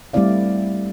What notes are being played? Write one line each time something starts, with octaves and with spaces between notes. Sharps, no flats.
G3 A3 C4 E4 D5 F5